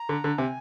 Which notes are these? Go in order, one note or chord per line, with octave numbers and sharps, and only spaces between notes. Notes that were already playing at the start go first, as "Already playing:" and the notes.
Already playing: A#5
D3
D3
C3 G#5